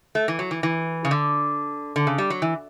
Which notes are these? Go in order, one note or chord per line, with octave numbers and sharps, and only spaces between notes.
A3
E3
F#3
E3
E3
C#3
D3
D3
C#3
G3
F#3
E3